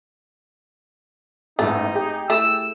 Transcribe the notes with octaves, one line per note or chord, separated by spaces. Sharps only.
A1 E2 G#2 A3 D#4
G4 G#4
A3 E4 E6